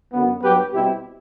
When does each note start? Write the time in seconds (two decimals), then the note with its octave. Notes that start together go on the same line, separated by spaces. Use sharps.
0.13 F#2 D3 F#3 B3
0.42 G2 F#3 B3 G4 B4
0.73 B2 G3 C4 E4 G4